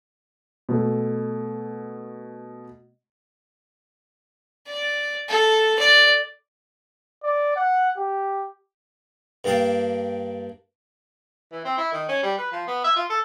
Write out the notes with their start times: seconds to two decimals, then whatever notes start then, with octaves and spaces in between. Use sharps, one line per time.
0.69 B2 A3
4.67 D5
5.29 A4
5.79 D5
7.23 D5
7.56 F#5
7.97 G4
9.44 G2 A#3 D4 F5 G5 A5
11.52 E3
11.65 C4
11.77 E4
11.92 D#3
12.08 C#4
12.23 G3
12.38 B4
12.52 F3
12.67 B3
12.84 E5
12.96 F4
13.09 A4